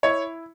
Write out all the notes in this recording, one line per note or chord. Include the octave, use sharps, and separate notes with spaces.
E4 C#5